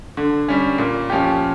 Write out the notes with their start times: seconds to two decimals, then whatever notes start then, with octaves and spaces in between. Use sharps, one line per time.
0.17 D3
0.48 G3 C#4
0.78 A#2
1.10 F3 C#4 G4